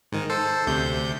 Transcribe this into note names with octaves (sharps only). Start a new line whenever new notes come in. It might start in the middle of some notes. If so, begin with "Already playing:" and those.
G#2 D#3
A4 C5
D2 C3 G6